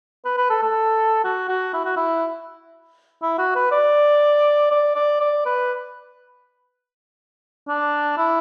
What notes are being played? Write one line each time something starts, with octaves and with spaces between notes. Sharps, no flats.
B4
B4
A4
A4
F#4
F#4
E4
F#4
E4
E4
F#4
B4
D5
D5
D5
D5
B4
D4
E4